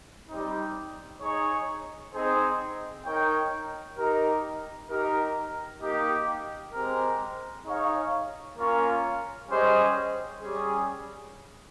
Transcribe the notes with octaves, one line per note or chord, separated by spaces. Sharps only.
G3 C4 D#4
D#4 G#4 C#5
C4 D#4 G#4 C5
D#4 A#4 C#5 G5
D#4 G4 A#4
D#4 G4 A#4
A#3 D#4 G4
G#3 C4 G4 A#4
D#4 G#4 C#5 F5
A#3 C#4 F4 A#4 C#5
G3 C#4 G#4 C5 D#5
G3 C#4 G#4